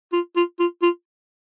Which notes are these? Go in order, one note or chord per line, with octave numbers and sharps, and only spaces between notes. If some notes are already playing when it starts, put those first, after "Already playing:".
F4
F4
F4
F4